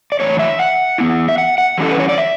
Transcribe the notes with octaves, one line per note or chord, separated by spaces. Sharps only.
D5
A2 E3 B3 D4 C#5
E5
F#5
E3 B3 E4
E5
F#5
F#5
E3 G3 C#4 E4 A4
B4
C#5
D5
E5